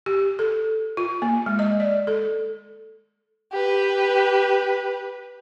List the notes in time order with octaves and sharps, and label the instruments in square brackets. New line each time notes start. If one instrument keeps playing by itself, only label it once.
[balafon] G4
A4
F4
A#3
G#3
D#5
D5
A4
[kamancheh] G4 B4